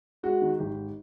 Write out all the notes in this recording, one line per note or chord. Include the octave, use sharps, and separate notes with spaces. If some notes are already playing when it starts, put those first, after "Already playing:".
G#3 F#4
D#3
G#1 G4